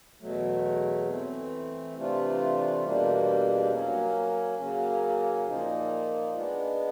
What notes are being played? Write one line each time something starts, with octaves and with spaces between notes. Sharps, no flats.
E2 B2 F#3 A3
E3 A3 C4
C3 E3 A3 D4 F4
E2 B2 G3 A#3 D4
F#3 A#3 C#4
C#3 F#3 A#3 C#4
A#2 F3 A#3 D#4
G#3 B3 D4